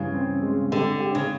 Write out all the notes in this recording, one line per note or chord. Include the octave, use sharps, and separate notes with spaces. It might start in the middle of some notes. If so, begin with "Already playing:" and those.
Already playing: G2 C#3 E3
C4
G#3
D3 G4
G4
C#3